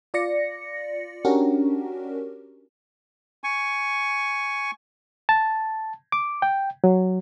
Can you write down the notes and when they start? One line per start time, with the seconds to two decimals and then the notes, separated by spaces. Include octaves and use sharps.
0.14 F4 D5 A#6 C#7
1.25 C#4 D4 F#4 G4 A#4
3.44 G#5 C#6
5.29 A5
6.12 D6
6.42 G5
6.84 F#3